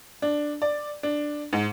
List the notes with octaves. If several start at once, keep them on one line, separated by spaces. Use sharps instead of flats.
D4
D5
D4
G#2